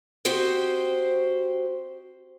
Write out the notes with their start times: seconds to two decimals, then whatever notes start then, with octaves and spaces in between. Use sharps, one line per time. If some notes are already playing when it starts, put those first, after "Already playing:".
0.25 C4 F#4 G4 C5 D#5